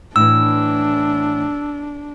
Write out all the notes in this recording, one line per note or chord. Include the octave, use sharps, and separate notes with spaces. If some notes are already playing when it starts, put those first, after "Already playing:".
A2 E3 D4 E6